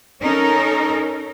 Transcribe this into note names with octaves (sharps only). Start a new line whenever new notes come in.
C#4 D#4 A4 A#4